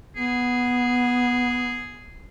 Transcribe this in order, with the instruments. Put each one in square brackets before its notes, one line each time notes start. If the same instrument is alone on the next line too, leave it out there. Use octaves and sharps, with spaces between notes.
[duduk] B3 [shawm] G#4